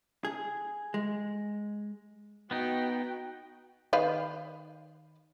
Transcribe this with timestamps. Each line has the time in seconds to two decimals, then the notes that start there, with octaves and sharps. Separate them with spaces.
0.25 G#4
0.94 G#3
2.51 B3 D#4 F#4 G5
3.93 D#3 B4 F5